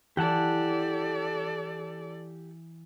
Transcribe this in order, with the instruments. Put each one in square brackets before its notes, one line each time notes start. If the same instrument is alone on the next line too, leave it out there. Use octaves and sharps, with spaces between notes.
[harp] E3 [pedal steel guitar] G4 F#5 A5 [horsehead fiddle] A4 D5